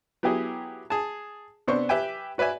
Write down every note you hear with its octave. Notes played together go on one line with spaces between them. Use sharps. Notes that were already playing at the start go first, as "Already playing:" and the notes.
F#3 B3 E4 G4 G#4
G#4 A5
C3 B3 D4 C5 C#6
G4 B4 E5 G5 G#5
F#4 B4 D5 E5 G#5